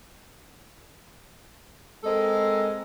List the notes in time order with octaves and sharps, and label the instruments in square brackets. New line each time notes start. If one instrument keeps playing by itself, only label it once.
[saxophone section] G#3 C4 A4 A#4 D#5